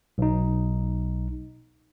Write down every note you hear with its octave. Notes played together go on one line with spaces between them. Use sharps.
B1 D#4